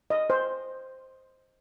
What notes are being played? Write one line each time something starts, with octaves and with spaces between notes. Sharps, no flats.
D#5
C5